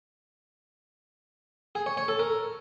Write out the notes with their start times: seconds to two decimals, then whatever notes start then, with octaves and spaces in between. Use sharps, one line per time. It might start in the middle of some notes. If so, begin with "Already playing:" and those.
1.75 G#4
1.86 C#5
1.97 C#5
2.08 A4
2.19 A#4